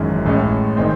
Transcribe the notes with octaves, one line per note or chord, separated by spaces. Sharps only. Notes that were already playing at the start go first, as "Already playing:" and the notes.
Already playing: G#1 F#2 E3 G#3 C#4
A1 A2 G#3 C#4
D#3 G#3 C4